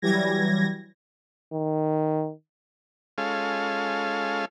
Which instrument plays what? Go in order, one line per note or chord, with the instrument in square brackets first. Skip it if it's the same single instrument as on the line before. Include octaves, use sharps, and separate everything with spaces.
[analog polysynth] E3 F#3 G3 G#6 A#6
[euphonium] D#3
[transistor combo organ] G#3 C#4 F4 A4 F5